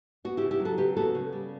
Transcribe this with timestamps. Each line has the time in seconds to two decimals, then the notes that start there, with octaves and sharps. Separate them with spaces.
0.25 B3 F#4
0.37 E4 G4
0.42 C#3
0.51 E4 G4
0.60 F#3
0.65 F#4 A4
0.78 C#3 G4 B4
0.97 B3 F#4 A4
1.15 C#3
1.33 G3